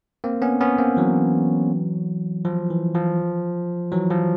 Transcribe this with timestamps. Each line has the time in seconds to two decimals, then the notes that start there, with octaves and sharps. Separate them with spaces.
0.24 A#3 C4
0.42 B3 C#4
0.61 B3 C#4
0.78 A#3 C4
0.97 E3 F#3
2.45 F3
2.70 E3
2.94 F3
3.92 E3 F#3
4.10 F3